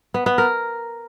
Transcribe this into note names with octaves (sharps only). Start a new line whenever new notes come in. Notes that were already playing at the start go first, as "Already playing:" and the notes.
B3
B3
A#4